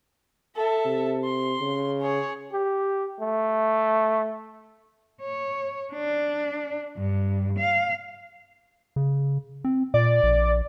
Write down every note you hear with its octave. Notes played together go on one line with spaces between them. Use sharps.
A4 E5
C3
C6
C#3
G#4 C#5
G4
A3
C#5
D4
G2
F5
C#3
C4
A#2 D5
A#1